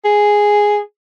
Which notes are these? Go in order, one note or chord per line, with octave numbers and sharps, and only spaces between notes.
G#4